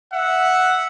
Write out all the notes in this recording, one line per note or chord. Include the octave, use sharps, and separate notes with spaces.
E5 F#5